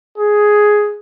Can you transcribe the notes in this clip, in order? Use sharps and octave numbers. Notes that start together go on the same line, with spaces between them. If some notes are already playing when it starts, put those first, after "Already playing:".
G#4